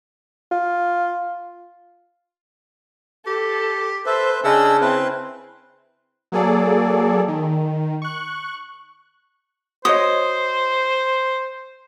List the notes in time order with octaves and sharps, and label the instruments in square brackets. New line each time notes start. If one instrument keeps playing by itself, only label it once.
[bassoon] F4
[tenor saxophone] G4 [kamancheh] A4
[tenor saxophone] A4 [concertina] B4 E5 [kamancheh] C5
[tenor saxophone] C#3 [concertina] D4 E6 [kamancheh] G#4 D#5
[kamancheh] C4 E4 [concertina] B4
[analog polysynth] F#3 A#3 G#4 A4 D5
D#3
C#6 F#6
[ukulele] F#4 C#5 D#5 [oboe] C5 [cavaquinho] D#6